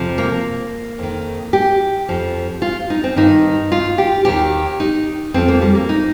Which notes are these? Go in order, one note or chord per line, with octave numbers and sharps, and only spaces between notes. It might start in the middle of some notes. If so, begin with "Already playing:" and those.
Already playing: F2 C3 F3
A#3
F2 D#3
G4
F2 F3
F4
D#4
C4
G2 D#3 D#4
F4
G4
D#2 D#3 G4
D#4
F2 F3 C4
A#3
G3
A#3
D#4